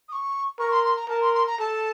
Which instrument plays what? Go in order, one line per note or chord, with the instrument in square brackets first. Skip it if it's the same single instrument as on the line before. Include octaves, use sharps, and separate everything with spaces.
[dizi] D#6
C#6
[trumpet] A#4 [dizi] C#6
[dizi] C6
C6
A#5
[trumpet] A#4 [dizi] A5
[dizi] C6
C6
A#5
[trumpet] A4 [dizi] A5